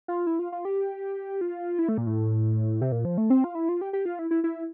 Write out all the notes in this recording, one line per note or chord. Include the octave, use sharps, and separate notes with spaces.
F4
E4
F4
F4
G4
F4
E4
A3
A#2
A2
C3
A#2
F3
A3
C4
F4
E4
F4
G4
G4
F4
E4
E4
E4